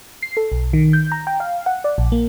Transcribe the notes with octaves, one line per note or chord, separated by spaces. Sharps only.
C7
A4
B1
D#3
G6
A#5
G5
F5
F#5
D5
A#1
A#3